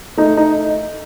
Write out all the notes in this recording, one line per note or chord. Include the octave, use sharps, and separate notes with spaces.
A3 D#4
D#4